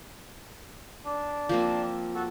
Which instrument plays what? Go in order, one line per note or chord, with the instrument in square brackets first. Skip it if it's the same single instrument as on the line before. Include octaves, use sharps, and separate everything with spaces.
[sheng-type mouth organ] D4
[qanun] F3 A#3 C4
[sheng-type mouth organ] F#4 A4